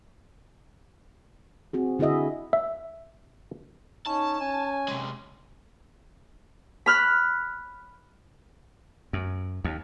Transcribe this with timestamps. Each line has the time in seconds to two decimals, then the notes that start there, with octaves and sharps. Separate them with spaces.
1.73 C4 F#4 G#4
1.99 D3 E4 F#4 G#4 D#5 E5
2.53 E5
4.07 C#4 D#4 A5
4.41 C#4 G#5
4.88 C3 G#3
6.86 B5 F6 F#6
9.13 F#2
9.64 D#2